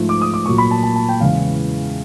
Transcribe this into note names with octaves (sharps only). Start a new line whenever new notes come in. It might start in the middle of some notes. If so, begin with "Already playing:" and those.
Already playing: G#2 F3 A3
D6
D#6
D6
A#2 F#3 A#3 C#6
B5
A5
A5
A5
G5
E2 C#3 E3 G#3 F5